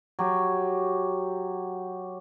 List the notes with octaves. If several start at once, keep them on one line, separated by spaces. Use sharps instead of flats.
F#3 G4